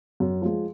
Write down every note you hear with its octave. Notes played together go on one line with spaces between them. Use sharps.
F#2
F3 G#3